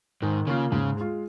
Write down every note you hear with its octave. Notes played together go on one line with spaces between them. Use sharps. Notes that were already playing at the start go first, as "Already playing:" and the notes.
G#2 D#3
C#3 A#3 F4
G#2 C#3
G#3 F4